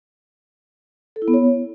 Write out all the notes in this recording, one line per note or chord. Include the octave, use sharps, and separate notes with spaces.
A4
E4
B3
C#5